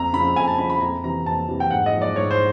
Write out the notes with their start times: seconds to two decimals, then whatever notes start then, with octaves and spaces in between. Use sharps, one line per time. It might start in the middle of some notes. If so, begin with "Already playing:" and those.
Already playing: F2 A#5
0.13 C#3 F3 B5
0.36 F2 G#5
0.47 A5
0.58 C#3 F3 B5
0.70 B5
0.81 F2 A#5
1.04 C3 E3 A#5
1.26 F2 A5
1.49 C3 E3
1.60 G5
1.71 G#2 F#5
1.86 D#5
1.94 F3
2.02 D5
2.16 G#2 C#5
2.31 C5